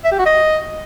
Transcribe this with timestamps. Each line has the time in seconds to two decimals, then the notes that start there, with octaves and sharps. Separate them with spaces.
0.05 E5
0.12 G4
0.19 F#4
0.26 D#5